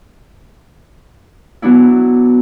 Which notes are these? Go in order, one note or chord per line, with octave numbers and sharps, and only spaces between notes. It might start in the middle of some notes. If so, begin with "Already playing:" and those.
F#3 B3 D4 E4